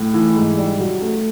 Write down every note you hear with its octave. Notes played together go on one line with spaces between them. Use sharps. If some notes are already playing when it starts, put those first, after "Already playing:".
Already playing: A2
E3
G#2
G3
F#3
A3